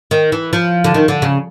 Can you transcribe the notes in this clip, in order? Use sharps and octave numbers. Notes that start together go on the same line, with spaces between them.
D#3
E3
F3
D3
D#3
D3
C#3